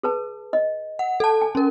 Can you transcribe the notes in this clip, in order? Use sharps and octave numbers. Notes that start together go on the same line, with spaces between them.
G#4 B4 A5
D#5
F#5
A4 A5
G#5
C#4 A#4